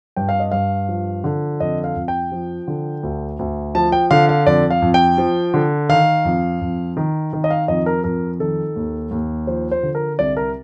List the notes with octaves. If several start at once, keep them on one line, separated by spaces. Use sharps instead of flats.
G2 G5
F5
D#5
G2 F5
F3
D3
F2 D#5
F5
F2
G5
F3
D3
D2
D2
F3 A5
G5
D3 F5
F5
F2 D5
F5
F2
G5
F3
D3
D#3 F5
F2
F2
D#3
D#3
D#5
F5
F2 D#5
A#4
F2 A#4
D#3 A4
D#2
D#2
F3 C5
C5
D3
A#4
C2 D5
A#4